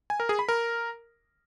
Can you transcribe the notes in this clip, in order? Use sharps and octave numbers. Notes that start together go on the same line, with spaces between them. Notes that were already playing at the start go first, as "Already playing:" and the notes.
G#5
A#4
G#4
B5
A#4